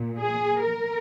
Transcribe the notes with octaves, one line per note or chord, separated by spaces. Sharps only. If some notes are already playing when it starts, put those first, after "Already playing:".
Already playing: A#2
G#4
A#4